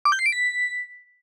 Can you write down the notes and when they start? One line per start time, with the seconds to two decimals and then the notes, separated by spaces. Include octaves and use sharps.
0.05 D6
0.12 G6
0.19 C7
0.26 D7
0.32 B6